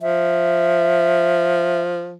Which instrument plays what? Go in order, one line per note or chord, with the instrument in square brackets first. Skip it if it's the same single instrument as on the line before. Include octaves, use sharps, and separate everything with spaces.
[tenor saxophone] F3 [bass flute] E5